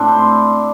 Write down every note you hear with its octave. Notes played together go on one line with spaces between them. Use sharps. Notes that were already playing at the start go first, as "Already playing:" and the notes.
Already playing: A2 C4 D4 E4
C5